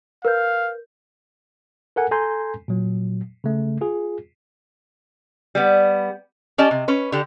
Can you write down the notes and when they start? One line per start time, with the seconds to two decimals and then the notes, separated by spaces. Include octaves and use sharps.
0.25 A#4 B4 F5 G6
1.96 A4 A#4 F#5 G#5
2.11 A4 G#5 A#5 C6 G6
2.68 A#2 F#3
3.44 C#3 A3
3.81 F4 G#4
5.55 G3 B3
6.58 C#4 G4 D5 D#5 A5
6.71 C3
6.88 C#4 B4
7.12 D3 G4